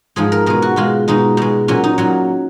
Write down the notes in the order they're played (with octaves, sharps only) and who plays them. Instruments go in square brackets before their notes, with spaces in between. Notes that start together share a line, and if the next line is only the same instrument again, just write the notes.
[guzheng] G#2 F3 G#3 G#4
A#4
B2 G#3 A#4
F#4
B2 G#3 F4
B2 G#3 D#4
B2 G#3
A#2 F#3 C#4
D#4
A#2 F#3